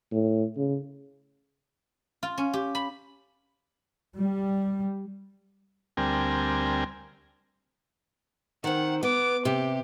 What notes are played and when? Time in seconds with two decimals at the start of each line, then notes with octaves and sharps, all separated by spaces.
0.12 A2
0.57 C#3
2.23 F4
2.38 C#4
2.54 G4
2.75 B5
4.18 G3
5.97 D2 G3 C4 A#4 G#5
8.64 D#3 C4 F#5
9.03 B3 D6
9.45 C3 G4